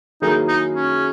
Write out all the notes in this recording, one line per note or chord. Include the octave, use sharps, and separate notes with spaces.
D#3 F#3 A#3 D#4 E4 G#4
D#4
C#4